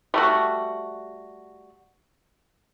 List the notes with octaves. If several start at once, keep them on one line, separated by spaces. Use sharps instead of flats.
G3 A3 F#4